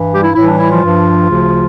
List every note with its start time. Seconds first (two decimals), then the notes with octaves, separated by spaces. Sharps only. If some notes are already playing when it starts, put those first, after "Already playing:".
Already playing: G2 E3
0.12 G3 G4
0.23 E4
0.35 A2 E3 G3 E4
0.47 D4
0.59 E4
0.70 F3 F4
0.82 G2 F3
1.30 D2 C#3 F3